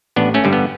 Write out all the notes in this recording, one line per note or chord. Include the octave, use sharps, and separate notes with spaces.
A1 B3 D4
A3 C#4
G2 D3 G3
B3